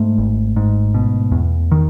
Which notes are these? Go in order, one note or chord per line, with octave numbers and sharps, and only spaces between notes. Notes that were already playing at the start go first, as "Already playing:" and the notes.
Already playing: G#2 A3
G#1
G#2
B2
E2
D#3